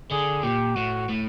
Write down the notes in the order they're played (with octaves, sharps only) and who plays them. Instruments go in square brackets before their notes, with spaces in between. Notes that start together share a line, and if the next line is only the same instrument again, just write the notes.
[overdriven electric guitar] D3 [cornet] G#4
[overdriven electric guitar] A#2 [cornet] G4
[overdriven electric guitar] A2 [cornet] F#4
[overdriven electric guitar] A2